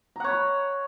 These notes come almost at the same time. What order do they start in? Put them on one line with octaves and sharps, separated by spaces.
A#5 F#5 C#5 B5